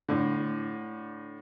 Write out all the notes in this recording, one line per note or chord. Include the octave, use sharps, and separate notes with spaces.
A2 D3